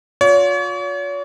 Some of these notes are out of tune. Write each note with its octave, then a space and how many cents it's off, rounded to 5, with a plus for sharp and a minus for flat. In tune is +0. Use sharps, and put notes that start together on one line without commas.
F4 +40 C#5 +40